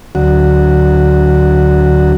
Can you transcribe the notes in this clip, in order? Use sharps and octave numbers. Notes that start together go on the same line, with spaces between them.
D2 F#3 F#4